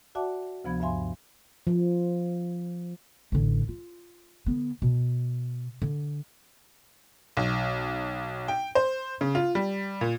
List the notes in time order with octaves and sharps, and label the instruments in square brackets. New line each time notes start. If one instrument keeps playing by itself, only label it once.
[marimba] F#4 D5 E5 F#5 A5 D6
D2 C3 F3 B3 B5 G#6
G2 E5 F5 G#5 C6
[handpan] F3
[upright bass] A1 D3
F4
D3 B3
B2
D3
[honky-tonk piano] B1
G5
C5
C#3
F4
G3
A#2